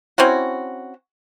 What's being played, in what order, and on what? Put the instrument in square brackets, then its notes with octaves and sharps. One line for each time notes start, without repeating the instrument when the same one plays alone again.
[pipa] C4 C#4 E4 F#4